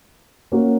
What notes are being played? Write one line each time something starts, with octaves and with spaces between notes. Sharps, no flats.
A#3 C#4 F#4